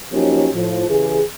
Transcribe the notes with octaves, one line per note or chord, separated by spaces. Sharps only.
F3 F#3 A#3 C#4 D#4 G4
A2 F3
C#3 E3 G4 G#4